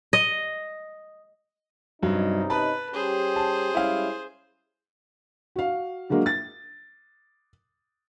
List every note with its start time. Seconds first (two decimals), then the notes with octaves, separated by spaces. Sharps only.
0.13 D#5
2.03 G2 C3 F#3 C#4 D#4
2.50 B4 A5 B5
2.94 G3 C#4 G4 G#4 C5
3.36 A5
3.75 G3 G#3 C#4 E4 F5
5.56 F#4 F5
6.10 D3 F#3 G#3 A#3
6.26 A6